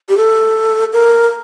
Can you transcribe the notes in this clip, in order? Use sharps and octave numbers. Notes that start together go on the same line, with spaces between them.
G4
A4
A#4